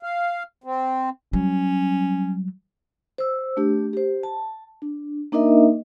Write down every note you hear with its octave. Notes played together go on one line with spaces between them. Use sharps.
F5
C4
F#3 G3 C#4
C5 E6
A3 D4 G4
G4 C5
A5
D4
A#3 D4 D#4 A#4 D#5 E5